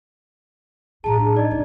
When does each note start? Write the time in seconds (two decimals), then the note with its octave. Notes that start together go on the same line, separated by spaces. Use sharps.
1.04 A2 F#3 G#4 A5 A#5
1.19 D4
1.35 D#4 D5 D#5
1.51 G#1 C#2